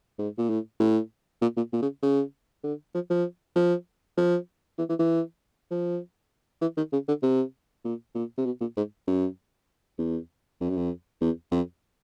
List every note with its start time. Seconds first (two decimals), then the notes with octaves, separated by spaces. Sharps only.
0.19 G#2
0.38 A#2
0.50 A2
0.80 A2
1.42 A#2
1.57 A#2
1.73 A#2
1.82 C#3
2.03 C#3
2.64 D3
2.95 F3
3.10 F3
3.56 F3
4.17 F3
4.78 E3
4.89 E3
4.99 E3
5.71 F3
6.62 E3
6.77 D#3
6.93 C#3
7.08 D3
7.23 C3
7.85 A#2
8.15 A#2
8.38 C3
8.46 B2
8.61 A#2
8.77 G#2
9.07 F#2
9.98 E2
10.61 F2
10.70 F#2
10.77 F2
11.21 E2
11.51 F2